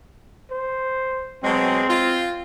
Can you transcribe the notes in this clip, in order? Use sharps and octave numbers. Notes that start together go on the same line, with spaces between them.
C5
B2 F#3 G#3 C4
F4